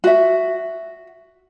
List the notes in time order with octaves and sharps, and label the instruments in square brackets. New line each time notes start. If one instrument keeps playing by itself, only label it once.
[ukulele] F#4 E5